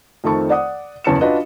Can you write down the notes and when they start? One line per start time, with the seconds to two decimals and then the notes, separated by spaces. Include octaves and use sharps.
0.24 F2 D#3 A3 C4 A5 C#6
0.50 D5 F#5 D#6
1.04 F#1 E2 C#4 A5 C#7 E7
1.21 D4 F4 F#4 B4 D#5